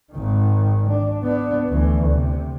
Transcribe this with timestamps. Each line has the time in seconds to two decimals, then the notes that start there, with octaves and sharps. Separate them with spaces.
0.13 G#1 D#3
0.89 D4
1.23 B3 D4
1.69 D2 E3
2.09 C3